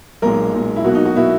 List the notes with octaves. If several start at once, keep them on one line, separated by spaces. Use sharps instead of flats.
B1 A#2 G#3 A#4
B1 A#2 G#3
E4
B1 B2 A#3 F#4
D#4
F#4
B2 A#3 E4